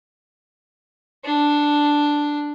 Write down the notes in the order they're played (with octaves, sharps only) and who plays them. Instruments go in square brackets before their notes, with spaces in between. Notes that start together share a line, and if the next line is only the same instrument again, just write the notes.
[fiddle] D4